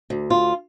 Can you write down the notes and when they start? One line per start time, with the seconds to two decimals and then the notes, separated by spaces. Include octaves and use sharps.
0.10 D2
0.30 F4